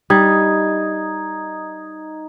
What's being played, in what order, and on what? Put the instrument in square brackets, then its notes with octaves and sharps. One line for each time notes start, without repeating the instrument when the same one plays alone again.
[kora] G3 [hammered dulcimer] D#4 [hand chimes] D#6 G#6